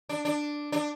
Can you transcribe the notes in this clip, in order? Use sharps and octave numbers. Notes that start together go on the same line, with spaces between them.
D4
D4
D4